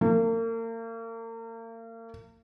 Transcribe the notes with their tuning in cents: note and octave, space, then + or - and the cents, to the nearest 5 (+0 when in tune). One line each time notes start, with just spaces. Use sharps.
A#3 -40